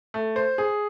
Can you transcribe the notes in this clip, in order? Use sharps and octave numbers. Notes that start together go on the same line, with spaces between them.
A3
C5
G#4